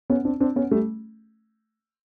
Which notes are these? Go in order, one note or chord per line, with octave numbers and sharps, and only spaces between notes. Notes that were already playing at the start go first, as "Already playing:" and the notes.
B3 C#4
C4 D4
C4 D4
B3 C#4
G3 A3